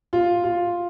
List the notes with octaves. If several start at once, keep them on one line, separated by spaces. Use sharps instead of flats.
F4
F4